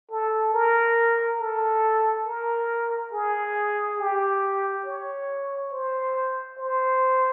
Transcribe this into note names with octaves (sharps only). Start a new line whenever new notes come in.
A4
A#4
A4
A#4
G#4
G4
C#5
C5
C5